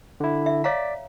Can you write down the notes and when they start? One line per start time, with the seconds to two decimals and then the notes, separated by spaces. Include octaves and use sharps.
0.20 D3 E4
0.46 E5
0.64 C#5 D5 F5 A#5 B6